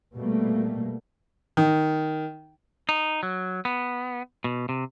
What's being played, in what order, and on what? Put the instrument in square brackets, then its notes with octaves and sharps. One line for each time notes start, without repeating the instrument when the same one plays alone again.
[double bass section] B2 G3 A3 A#3
[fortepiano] D#3
[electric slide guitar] D#4
F#3
B3
B2
C3